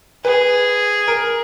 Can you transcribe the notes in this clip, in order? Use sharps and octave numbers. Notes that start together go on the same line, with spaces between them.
G#4 B4
A#4